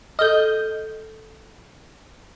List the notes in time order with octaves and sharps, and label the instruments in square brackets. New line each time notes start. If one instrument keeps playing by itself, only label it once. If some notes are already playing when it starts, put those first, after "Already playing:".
[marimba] A4 F6 [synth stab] D#5 G6